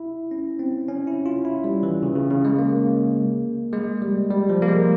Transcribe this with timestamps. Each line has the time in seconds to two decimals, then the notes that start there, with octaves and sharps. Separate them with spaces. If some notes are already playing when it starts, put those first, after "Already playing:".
Already playing: E4
0.31 C#4
0.59 C4
0.88 C#4
1.07 E4
1.26 F4
1.45 E4
1.64 G3
1.83 E3
2.03 C#3
2.16 C#3
2.31 C#3
2.45 G#3
2.59 A#3
3.73 G#3
4.02 G3
4.31 G3
4.49 F3
4.62 A#3
4.68 G#3